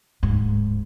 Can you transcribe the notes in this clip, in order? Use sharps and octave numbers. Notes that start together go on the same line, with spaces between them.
D1 G#2